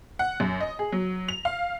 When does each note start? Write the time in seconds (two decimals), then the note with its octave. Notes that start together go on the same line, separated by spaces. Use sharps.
0.19 F#5
0.40 F#2
0.60 D#5
0.79 G#4
0.92 F#3
1.28 F7
1.45 F5